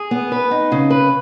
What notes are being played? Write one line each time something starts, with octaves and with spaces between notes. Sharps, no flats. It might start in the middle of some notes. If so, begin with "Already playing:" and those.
Already playing: G#4
B3
B4
D#4
C#3
B4